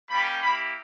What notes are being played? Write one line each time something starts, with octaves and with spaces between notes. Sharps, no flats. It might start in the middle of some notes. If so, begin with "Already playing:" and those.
G3 A#3 C#4 G4 B5
A#3 E4 G4 B5